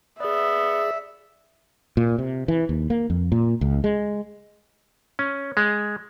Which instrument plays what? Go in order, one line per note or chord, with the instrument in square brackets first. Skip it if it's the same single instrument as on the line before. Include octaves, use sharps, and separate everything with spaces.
[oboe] B3 [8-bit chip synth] G#4 D5 [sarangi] E5
[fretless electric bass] A#2
C3
E3
D#2
A#3
F2
A#2
C#2
G#3
[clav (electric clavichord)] C#4
G#3